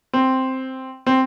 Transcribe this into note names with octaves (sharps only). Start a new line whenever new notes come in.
C4
C4